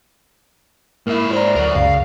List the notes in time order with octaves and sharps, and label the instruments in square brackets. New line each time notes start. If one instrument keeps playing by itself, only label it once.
[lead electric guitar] G#2 E5 [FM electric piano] A#3 [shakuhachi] E4
[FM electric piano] C5 A#5 [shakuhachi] D5
[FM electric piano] D2 [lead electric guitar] F#3 A#4
[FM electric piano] C#2 F#2 [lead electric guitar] F5